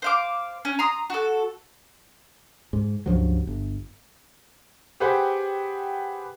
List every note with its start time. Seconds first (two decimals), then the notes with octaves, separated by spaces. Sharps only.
0.02 C5 F5 D6
0.65 C#4
0.79 A#5 C6 D#6
1.10 F#4 A4
2.73 G#2
3.06 C#2 G2 F3 F#3
3.47 G1
5.00 G4 G#4 B4 C5 F#5 G5